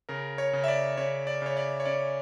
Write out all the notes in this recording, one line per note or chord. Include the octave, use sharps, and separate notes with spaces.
C#3 A#4
C#5
C#3
E5
D5
C#3 C#5
D5
C#3 C#5
D5
C#5
C#4 D5